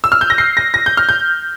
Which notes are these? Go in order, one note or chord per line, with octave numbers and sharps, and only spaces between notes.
E6
F6
G6
A#6
C7
A#6
A#6
G6
F6
G6